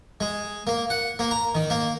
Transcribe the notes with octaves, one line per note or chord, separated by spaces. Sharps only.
G#3
A#3
F#5
A#3
A#5
D#3
A#3